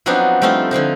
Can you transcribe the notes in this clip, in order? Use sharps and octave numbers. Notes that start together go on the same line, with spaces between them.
F3 F#3 B3 C4 D4 D#4
F3 G3 A3 C4 D#4 F4
D3 F3 C4 D#4